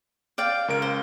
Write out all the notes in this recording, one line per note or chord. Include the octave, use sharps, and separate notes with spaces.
D5 F5 G5
C#2 A#4 D7
C5